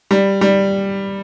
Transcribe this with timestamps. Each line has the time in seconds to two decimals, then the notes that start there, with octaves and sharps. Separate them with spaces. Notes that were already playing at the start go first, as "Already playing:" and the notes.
0.11 G3
0.41 G3